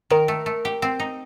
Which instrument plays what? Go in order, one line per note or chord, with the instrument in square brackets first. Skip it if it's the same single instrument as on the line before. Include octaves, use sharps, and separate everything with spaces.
[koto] D#3 [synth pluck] A#4
[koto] A3
A3
G4
C4
D#4